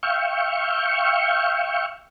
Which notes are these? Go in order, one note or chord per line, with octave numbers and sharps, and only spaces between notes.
E5 F5 G5 C#6